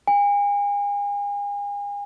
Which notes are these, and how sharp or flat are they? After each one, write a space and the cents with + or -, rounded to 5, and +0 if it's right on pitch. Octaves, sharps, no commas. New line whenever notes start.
G#5 -40